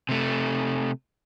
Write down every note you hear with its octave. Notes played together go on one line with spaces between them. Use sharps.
C3 A3